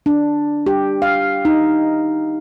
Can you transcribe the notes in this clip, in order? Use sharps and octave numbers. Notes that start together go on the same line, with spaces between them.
D4
G4
F5
D#4